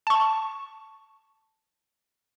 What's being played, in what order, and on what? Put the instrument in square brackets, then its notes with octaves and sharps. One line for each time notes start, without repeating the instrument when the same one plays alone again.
[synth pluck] A5 C#6